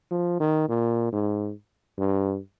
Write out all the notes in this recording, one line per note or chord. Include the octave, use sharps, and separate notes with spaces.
F3
D#3
A#2
G#2
G2